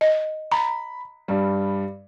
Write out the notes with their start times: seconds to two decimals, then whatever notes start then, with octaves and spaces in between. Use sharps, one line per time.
0.01 D#5
0.51 A#5 B5
1.28 G2 G3